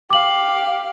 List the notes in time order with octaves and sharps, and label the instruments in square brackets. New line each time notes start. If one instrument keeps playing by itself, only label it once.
[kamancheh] G4 F5 [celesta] D6 F#7